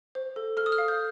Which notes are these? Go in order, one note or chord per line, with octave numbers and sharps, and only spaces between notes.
C5
A4
A4 F6
D#6
F6
F5
G6